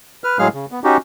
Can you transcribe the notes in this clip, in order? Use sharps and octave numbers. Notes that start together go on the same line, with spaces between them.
B4 F6
A2 F#3 G#3 G#4 F5 F6
C#3
B3
C#4 D#4 F#4 G4